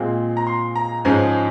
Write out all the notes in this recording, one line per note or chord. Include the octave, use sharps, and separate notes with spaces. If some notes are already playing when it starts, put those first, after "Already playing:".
Already playing: A#2 G#3 C4
A#5
C6
A#5
G#2 F3 G#3 C#4 G#5